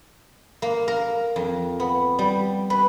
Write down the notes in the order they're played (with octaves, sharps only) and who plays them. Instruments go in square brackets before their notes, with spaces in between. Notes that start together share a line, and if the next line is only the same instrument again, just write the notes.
[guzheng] A#3
A#4
F2
B3
G3
B4